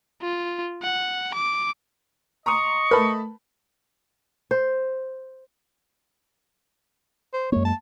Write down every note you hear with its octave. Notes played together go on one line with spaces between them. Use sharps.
F4
F#5
D6
D#5 A#5 C6 C#6 D#6
A3 A#4 B4 A5 B5
C5
C5
F#2 G#3 A#3 C#5
A5